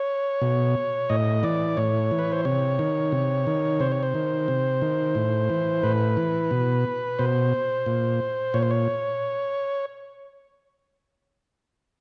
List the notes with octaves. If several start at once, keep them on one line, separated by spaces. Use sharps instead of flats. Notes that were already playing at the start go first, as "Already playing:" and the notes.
Already playing: C#5
B2
A2 D#5
E3 D5
A2 C#5
E3
B4
C5
C3 C#5
D#3
C3
D#3
C3 C5
C#5
C5
D#3
C3
D#3
A2
E3
A2 B4
E3
B2
B2 C5
A#2
A#2 C#5
C5
C#5